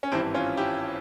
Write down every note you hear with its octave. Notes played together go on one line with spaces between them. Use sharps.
C#4
G#1 G2 E3 C4 E4
C#4 F4
E4 G4